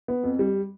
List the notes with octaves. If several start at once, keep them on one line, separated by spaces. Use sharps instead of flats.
B3
F2
G3